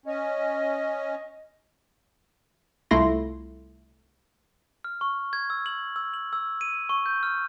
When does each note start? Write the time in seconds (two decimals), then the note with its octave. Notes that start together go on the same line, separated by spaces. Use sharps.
0.06 C#4 D#5
2.91 C2 A3 E4 F4 C6 A#6
4.84 F6
5.01 C#6
5.33 G#6
5.50 E6
5.66 F#7
5.96 E6
6.14 F#7
6.33 E6
6.61 D#7
6.89 C#6
7.06 G6
7.23 F6